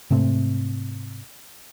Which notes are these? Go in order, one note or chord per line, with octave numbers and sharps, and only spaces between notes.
G#2 C3 A3 C4